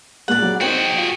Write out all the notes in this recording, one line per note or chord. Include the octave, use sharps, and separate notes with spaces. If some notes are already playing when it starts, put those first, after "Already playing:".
C#2 A#2 G#3 D5 F#5
C#3 F#3
C4 D#4 F#4 G#4 G5
F4